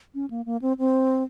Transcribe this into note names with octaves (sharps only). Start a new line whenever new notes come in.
C#4
A#3
A#3
C4
C4